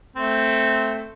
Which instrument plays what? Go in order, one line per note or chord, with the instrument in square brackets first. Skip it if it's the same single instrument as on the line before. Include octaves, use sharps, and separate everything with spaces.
[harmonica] A3 C4